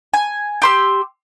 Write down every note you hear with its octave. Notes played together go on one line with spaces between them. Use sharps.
G#5
G4 C6 E6